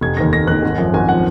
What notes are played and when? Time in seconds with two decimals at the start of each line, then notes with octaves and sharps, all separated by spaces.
0.01 F1 G#6
0.17 D#2 D#3 A#6
0.33 F1 A#6
0.47 D#2 D#3 F#6
0.63 G#1
0.78 F#2 F3
0.94 G#1 G#5
1.09 F3 F#5